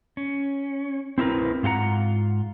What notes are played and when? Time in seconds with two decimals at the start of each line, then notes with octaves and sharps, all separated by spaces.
0.17 C#4
1.18 C4 E4 F#4 A#4 B4
1.63 G#2 F4 G4 F#5 A#5